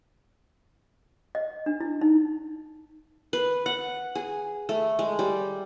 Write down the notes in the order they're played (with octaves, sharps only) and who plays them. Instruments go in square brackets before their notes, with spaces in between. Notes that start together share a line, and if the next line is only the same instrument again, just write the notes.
[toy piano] D#5
D4
E4
D#4
[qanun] B4
F#5
G#4
A3
G#3
G3